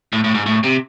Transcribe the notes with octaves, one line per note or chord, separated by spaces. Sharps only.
A2
A2
G#2
A2
C3